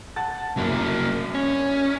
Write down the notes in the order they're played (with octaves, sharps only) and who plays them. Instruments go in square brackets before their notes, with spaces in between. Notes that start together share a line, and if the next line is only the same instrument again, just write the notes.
[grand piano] F#5 A5 A6
[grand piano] G1 C2 F#2 [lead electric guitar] F#3 A#3
[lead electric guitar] C#4